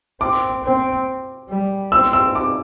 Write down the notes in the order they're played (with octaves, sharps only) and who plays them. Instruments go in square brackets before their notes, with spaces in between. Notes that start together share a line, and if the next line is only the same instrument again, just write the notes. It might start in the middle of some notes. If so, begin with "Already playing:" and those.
[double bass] C4 [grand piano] D6
[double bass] C4
G3
[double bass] C4 [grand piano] E6
[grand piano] E6
D6